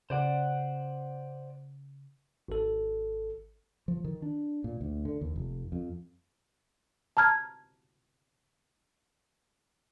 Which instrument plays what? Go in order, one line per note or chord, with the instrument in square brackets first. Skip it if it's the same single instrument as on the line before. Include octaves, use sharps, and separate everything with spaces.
[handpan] C#3 [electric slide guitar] C5 D5 F#5
[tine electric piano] G#1 A4
[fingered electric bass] F3
D#3
D4
A#2
D2
D3
D#2
F1
F2
[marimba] A5 A#5 F6 G#6